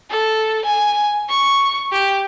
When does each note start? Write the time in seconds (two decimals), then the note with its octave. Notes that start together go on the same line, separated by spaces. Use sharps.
0.10 A4
0.65 G#5
1.29 C#6
1.92 G4